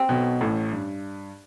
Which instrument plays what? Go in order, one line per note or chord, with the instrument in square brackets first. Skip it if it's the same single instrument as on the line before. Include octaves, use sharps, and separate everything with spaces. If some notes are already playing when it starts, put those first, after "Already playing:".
Already playing: [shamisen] C4
[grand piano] B1 B2
A1 A2
G2